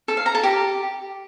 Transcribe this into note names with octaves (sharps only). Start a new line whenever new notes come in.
A4
F5
A#5
A4
G4